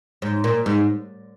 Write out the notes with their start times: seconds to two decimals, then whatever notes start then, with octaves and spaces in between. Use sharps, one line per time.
0.22 G#2
0.44 A#2
0.66 G#2